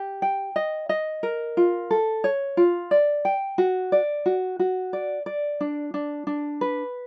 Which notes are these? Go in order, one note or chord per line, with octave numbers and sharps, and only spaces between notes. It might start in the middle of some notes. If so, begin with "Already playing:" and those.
Already playing: G4
G5
D#5
D#5
A#4
F4
A4
C#5
F4
D5
G5
F#4
D5
F#4
F#4
D5
D5
D4
D4
D4
B4